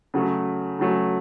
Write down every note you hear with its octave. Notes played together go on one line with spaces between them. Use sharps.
C#3 F#3 A3
C#3 F#3 A3